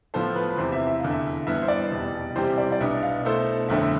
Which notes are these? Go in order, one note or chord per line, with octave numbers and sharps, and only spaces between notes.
A2 F3 B3 F4 A4 C5
B4
B4
E2 C3 E3 C5
E5
E5
F1 E2 D3 F5
E5
G2 E3 B3 E4 B4 E5
C5
D5
F1 E2 B2 G3
C3 E3 G3 C4 G4 C5
D5
D5
B1 B2 B3 D4 E5
F5
B2 A3 E4 A4 C5
G1 F2 D3 A3 E5